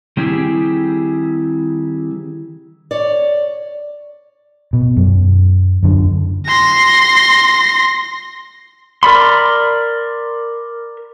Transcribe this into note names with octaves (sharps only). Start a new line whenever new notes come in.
D#3 G3 C4 E4 G4 G#4
C#5 D5
B2
F#2
F#2 D3
C6 A#6
A#4 D5 B5 C6